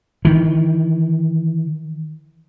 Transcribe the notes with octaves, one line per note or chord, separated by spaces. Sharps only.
D#3 E3